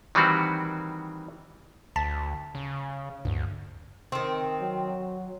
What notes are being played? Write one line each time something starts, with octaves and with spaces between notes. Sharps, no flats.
D#3 E3 G3 C4 F#4
D2 A5 A6 B6
C#3
D2 G2
D#3 C4
F#3